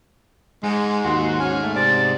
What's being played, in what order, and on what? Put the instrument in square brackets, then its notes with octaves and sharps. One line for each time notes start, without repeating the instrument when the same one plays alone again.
[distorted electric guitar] G#2 [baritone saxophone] G#3
[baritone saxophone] D#2 [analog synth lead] F#4 [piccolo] C6
[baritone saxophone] C#4 [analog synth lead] G#5 [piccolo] F6
[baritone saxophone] A3
[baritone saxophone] C3 [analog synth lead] D5 [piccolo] A6